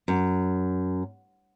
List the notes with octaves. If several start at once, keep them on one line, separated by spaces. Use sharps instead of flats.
F#2